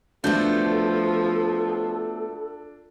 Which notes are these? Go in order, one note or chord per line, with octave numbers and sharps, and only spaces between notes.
F3 A3 B3 D4 F#4 A4 G6